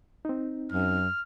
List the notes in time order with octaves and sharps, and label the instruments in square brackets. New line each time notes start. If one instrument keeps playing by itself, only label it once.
[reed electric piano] C4 D#4
[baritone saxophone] F#2 [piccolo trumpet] F6